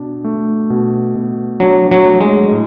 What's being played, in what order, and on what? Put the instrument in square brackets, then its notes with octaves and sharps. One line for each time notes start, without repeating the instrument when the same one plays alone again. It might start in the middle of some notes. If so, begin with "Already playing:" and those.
Already playing: [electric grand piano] B2 D4
A3
B2
B2
[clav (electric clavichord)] F#3 [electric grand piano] D4
[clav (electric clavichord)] F#3
[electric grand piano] A3
[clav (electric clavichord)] G#3
[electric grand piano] A2